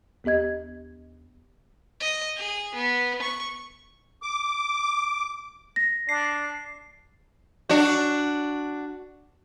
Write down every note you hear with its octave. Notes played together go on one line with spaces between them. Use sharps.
D#2 B3 G4 D#5 G#6
D#5
G#4
B3
C#6
D6
A#6
D4 C7
D4 F#4